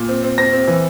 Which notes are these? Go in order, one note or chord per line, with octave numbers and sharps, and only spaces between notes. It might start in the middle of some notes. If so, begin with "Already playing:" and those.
Already playing: A#2
C4
C4
C4 A#6
C4
E3